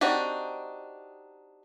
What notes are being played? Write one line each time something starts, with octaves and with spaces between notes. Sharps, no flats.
C4 D4 D#4 F#4 G4